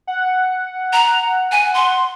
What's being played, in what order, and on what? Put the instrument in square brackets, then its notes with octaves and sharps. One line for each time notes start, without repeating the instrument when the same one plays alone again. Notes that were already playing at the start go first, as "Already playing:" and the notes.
[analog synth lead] F#5
[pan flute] A#5
G#5
C6